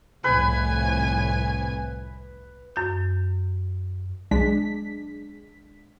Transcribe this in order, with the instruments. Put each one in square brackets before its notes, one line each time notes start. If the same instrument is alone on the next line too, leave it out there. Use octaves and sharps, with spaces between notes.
[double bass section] C2 F2 A2 [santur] B4 [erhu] G#5
[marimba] F#2 G6
[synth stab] B1 G#3 D4 B6